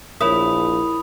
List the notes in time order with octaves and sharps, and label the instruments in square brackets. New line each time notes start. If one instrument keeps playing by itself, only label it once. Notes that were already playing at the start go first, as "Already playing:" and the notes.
[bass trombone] A#1 [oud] E4 [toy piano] A#4 C#5 [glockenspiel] B5 D#6